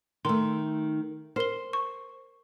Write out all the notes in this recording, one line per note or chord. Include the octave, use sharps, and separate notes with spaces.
D#3 A3 C6
A#4 C5 G7
C#6